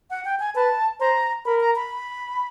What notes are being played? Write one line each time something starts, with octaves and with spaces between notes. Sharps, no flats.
F#5
G5
G#5
B4 A5
C5 A#5
A#4 B5
A#5
B5